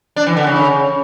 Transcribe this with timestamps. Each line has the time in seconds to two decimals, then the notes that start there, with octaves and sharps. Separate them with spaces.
0.16 D4
0.27 E3
0.37 D3
0.47 C#3